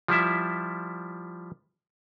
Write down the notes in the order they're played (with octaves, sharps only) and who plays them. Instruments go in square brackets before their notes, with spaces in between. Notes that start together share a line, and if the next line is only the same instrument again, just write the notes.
[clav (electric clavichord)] F3 G3 E4 E5